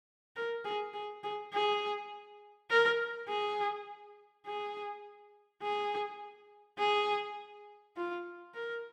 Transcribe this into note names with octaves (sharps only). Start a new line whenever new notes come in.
A#4
G#4
G#4
G#4
G#4
A#4
G#4
G#4
G#4
G#4
F4
A#4